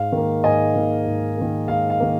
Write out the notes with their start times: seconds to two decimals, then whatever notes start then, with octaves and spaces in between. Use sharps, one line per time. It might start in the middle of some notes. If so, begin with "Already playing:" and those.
Already playing: G#2 F5
0.12 D#3 A#3
0.43 G#2 D#5 G#5
0.75 D#3 A#3
1.06 G#2
1.37 D#3 A#3
1.68 G#2 F5
1.90 F5
2.00 D#3 A#3